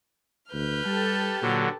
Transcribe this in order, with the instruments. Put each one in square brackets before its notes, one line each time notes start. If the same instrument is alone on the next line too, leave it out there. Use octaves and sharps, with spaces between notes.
[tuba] D2 [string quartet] B4 F6 G6
[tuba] G3 [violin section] G4 A4 A5
[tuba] A#2 [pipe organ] D3 F#3